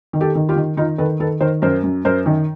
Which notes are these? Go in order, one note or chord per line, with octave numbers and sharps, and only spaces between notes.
D#3
G4 A4
D#3
F4 G4
D#3
D#3 D#4 F4
D#3 A4 B4
D#3 A4 B4
D#3 A#4 C5
F#2 A#4 C5
F#2
F#2 A#4 C5
D#3